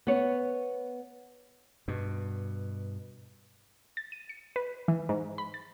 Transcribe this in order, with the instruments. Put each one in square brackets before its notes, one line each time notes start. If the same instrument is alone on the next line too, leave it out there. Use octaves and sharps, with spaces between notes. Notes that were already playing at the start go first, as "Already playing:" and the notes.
[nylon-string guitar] B3 C#5
[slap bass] G2 B2
[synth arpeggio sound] A6
D#7
C#7
B4
E3
G#2
B5
A6